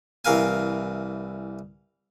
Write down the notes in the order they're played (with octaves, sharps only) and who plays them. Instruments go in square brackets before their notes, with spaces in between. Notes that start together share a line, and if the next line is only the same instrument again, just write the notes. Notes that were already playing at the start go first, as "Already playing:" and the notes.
[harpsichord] C2 E3 A#4 F5 G#5